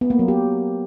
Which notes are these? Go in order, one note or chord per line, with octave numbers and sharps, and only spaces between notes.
B3
A#3
F#3
G4